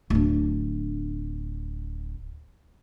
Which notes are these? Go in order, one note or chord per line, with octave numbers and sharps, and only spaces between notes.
D1 D4